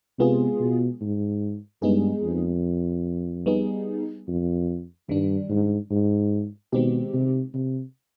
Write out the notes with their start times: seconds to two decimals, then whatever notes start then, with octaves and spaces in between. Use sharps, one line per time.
0.19 C3 G#3 B3 F4 G#4
0.60 B2
1.01 G#2
1.82 G2 G#3 B3 D#4 G#4
2.23 F2
3.46 G3 B3 D#4 G#4
4.28 F2
5.09 G2 D#3 G3 D4
5.50 G#2
5.91 G#2
6.73 B2 D#3 G#3 C4 D#4 G4
7.14 C3
7.54 C3